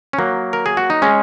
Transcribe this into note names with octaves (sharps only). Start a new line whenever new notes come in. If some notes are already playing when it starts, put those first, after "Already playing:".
C#4
F#3 A#3
A#4
G#4
F#4
D#4
G#3 C#4